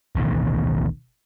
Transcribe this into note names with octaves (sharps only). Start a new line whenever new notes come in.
D1 A1 B2 D#3